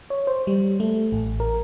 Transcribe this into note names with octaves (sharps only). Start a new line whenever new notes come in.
C#5
C5
G3
A3
A1
A#4